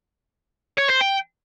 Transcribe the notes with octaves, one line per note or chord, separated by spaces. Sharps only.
C#5
C5
G5